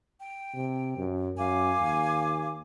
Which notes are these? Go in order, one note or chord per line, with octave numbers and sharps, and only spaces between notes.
G5
C3
F#2
F#2 F5 G#5 D6
D#2